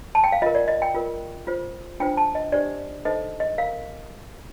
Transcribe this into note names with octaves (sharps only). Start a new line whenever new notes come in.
A5
G5
F5
F4 A#4 D#5
D5
D#5
G5
F4 A#4
F4 C5
D4 F4 C5 G5
A5
D#5
D4 G4 C5 D5
D#4 A4 C5 D#5
D#5
A#4 F5